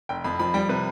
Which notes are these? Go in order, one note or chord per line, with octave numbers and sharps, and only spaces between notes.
F1 G5
F2 B5
F3 B5
G3 G5
C3 B4